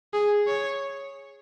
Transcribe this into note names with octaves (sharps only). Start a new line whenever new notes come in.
G#4
C#5